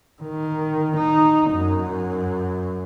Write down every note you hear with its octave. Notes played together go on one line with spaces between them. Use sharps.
D#3
D#4
F#2